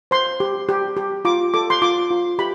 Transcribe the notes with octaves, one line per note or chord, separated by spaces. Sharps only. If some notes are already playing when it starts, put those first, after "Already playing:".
C5 C6
G4
G4
G4
F4 D6
A4 D6
C6
F4 D6
F4
G4 B5